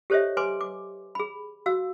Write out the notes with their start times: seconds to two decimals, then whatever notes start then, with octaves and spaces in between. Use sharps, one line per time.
0.10 G4 A4 C5 C#5 D#5 E5
0.37 B4 G#5 C6 D6
0.61 D6
1.15 G#4 B5
1.66 F#4 F5 E6